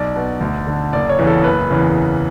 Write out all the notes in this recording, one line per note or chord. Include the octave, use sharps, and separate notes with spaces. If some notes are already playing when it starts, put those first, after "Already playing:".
Already playing: B1 D5
B2
D2
D3
F#1 D5
C#5
E2 C#3 E3
A4
F#1 B4
E2 C#3 E3